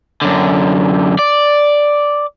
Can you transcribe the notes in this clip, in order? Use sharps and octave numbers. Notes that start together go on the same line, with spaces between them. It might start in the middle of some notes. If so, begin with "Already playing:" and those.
F#2 D3
D5